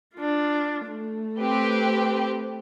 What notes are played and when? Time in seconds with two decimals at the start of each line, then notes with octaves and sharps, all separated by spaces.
0.16 D4 F4
0.87 A3
1.38 C4 G4 B4